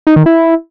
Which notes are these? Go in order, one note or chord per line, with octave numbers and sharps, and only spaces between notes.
D#4
D#3
E4